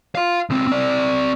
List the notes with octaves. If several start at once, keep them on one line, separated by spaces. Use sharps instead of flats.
F4 F5
C#2 C4
C4 D5